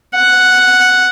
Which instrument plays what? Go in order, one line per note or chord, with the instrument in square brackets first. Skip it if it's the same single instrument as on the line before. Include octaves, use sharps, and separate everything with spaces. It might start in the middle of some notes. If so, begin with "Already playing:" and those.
[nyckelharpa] F#5